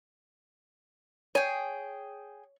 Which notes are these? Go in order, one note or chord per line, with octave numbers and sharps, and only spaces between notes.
G#4 C#5 G5